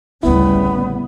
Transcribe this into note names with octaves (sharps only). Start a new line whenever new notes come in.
A1 D2 C#3 G3 B3 E4